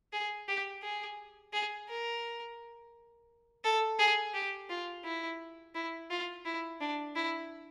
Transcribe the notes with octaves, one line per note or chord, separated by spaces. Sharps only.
G#4
G4
G#4
G#4
A#4
A4
G#4
G4
F4
E4
E4
F4
E4
D4
E4